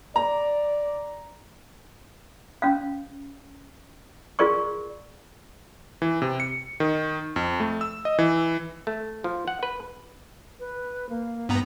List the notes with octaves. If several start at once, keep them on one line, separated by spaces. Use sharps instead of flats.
D5 A#5
C#4 F5
F4 G#4 A#4 D5 C6 C#6
E3
C3
C#7
D#3
F2
A3
E6
D#5
E3
A3
F3
F#5
B4
B4
A#3
G2 B3 A#5